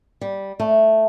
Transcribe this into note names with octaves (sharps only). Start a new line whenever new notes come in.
G3
A3